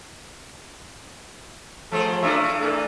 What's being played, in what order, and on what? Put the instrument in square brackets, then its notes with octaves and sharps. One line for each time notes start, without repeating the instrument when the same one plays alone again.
[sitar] F3 G#4 C5 [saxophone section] A3
[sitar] A3 D4 E4 [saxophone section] F4 C#5 E5
[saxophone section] E3 A#3 A4